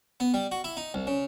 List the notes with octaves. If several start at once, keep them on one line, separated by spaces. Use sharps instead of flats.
B3
G3
F#4
E4
D#4
C2
C#3